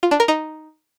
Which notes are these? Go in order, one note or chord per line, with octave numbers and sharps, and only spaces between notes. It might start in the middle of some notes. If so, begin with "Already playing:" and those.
F4
D4
A#4
D#4